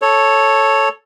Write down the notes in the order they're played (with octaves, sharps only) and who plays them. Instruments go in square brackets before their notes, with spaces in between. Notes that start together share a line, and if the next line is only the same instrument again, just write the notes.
[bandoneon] A4 C#5